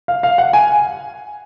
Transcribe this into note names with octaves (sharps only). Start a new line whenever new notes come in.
F5
F5
F#5
G#5